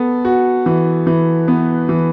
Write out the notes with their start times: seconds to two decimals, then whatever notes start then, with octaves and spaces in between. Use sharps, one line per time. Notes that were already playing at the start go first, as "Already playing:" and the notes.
Already playing: B3 A4
0.25 F#4
0.66 E3
1.07 E3
1.48 B3
1.89 E3